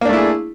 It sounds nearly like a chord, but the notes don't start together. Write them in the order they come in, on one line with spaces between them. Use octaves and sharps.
A#3 D4 A3 E4 G#4